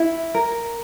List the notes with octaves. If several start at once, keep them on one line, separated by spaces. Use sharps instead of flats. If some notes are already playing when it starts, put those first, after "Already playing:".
Already playing: E4
A#4